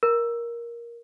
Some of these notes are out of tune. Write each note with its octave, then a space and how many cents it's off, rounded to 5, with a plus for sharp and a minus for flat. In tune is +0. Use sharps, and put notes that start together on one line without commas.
A#4 +10